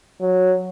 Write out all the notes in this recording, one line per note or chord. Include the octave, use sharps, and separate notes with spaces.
F#3